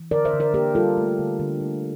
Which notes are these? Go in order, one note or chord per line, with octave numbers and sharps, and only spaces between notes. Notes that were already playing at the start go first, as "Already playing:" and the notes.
Already playing: E3
D3 A#4 D5
C5 E5
D3
A#4 D5
A#3 G4 A#4
G3 F4 A4
A3
D3
D3
A3